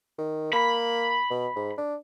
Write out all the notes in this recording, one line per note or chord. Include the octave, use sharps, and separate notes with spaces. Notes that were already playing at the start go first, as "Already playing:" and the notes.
D#3
A#3 B5
B2
G#2
D4